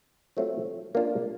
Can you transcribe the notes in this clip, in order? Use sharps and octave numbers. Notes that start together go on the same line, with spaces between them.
F#3 A3 C4 F4
A#3 D4 F4